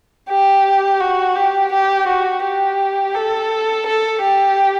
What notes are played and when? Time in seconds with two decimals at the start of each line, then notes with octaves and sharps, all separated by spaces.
0.29 G4
1.00 F#4
1.36 G4
1.72 G4
2.07 F#4
2.43 G4
3.15 A4
3.86 A4
4.22 G4